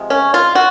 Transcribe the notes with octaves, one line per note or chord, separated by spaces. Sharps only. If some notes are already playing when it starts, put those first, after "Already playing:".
Already playing: C3 F3 G#3
C#4
F4
F#4